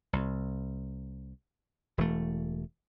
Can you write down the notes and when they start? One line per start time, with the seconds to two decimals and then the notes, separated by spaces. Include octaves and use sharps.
0.13 C2
1.98 E1 E3 A3